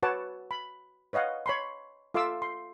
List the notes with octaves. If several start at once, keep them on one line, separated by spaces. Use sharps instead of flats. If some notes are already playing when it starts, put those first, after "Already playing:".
F#4 B4 C#5 F#5 A5 D6
B5
B4 C#5 D#5 F5 F#5
C#5 B5 C6
F4 A4 E5 C6 D6 E6
C6